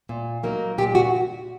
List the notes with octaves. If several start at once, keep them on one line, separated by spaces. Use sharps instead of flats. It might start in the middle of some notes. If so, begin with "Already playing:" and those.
A#2
F#3 A#3 D#4
A#2 G4
F#4